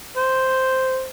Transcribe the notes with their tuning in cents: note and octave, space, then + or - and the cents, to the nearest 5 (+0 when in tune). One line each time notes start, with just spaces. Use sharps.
C5 -5